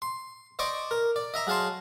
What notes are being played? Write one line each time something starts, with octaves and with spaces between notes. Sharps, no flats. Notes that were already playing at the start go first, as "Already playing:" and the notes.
C6
C5 D5 D#5 C#6 D6
A#4
D5
D#5 E5 A#5
F#3 G#4 F5 A5 C6